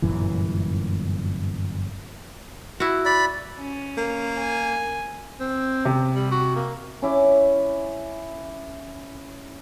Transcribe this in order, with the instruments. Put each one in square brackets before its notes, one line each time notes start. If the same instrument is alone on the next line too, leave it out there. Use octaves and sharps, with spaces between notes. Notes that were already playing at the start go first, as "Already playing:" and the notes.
[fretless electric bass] G1 F#2 A#2 E3
[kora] E4 F#4
[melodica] D5 B5
[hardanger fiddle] C#4
[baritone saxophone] A#3
[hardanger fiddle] G#5
[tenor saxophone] C4
[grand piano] C3
[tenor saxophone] G3
F#4
A#3
[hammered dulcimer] C#4 E4 D6